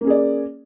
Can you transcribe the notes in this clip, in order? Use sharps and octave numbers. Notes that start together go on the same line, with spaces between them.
A#3 C#4 G#4 D5